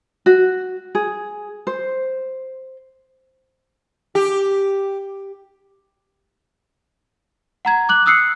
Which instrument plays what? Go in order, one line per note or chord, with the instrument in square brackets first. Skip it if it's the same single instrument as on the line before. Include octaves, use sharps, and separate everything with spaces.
[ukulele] F#4
G#4
C5
[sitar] G4
[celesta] F#5 A#5 G#6
D6 F#6 F#7
D#6 E6 F#6 C7 C#7